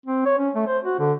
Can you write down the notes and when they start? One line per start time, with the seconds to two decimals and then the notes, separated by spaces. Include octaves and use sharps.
0.06 C4
0.26 C#5
0.38 C#4
0.55 A3
0.67 C5
0.83 F#4
0.99 D3